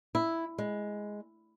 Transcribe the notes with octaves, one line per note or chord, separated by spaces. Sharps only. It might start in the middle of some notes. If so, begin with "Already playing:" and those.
E4
G#3